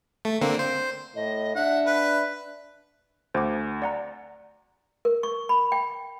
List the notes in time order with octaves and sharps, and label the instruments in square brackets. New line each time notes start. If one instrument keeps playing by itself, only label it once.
[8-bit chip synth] A3
D3 A#3 C4
C5
[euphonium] A2 [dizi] D#5
[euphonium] D4 [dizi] E5 [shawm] F#5
[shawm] B4
[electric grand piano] D2 [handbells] C5 D6
[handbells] D5 F#5 A#5
[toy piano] A#4
C#6
B5
G5